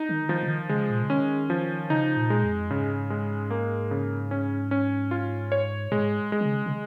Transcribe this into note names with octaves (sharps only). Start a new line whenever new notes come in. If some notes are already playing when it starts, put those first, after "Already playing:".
Already playing: D#4
D#3
D#3 F3
C#3
D#3
C#3 G#3
A#2
C#3
D#3 C#4
F3
C#3 D#4
A#2
G#3
F2
G#2 C#3
G#3
A#3
C#3
C#4
C#4
F4
C#5
G#2 G#3
G#3
D#3
C#3
C#3